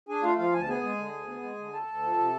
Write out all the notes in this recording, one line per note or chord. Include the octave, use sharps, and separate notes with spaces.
D4 G#4 G#5
A3 F4 F5
F3 F4 F5
D2 G#5
A5
B3 G#4 G#5
G#3
D3
D2
B3
G#3
D3
D2 A4 A5
D2
F3
C3